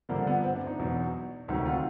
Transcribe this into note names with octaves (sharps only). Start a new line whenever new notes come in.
G2 D3 F3 A#3
B3
C4
D4
D#4
E2 B2 F#3
D2 C3 D#3 F#3 D#4
F4